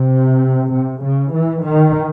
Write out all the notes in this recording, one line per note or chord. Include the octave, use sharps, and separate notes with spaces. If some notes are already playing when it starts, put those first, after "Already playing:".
Already playing: C3
C3
C#3
E3
D#3